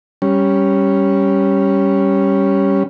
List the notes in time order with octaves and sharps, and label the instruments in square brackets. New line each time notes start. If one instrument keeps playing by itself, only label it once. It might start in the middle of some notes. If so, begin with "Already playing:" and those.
[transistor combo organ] G3 C#4